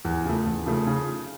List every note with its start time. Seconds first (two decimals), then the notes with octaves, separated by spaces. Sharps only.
0.05 E2
0.25 C#3 F3 A3
0.46 E2
0.66 C#3 F3 A3
0.87 C#3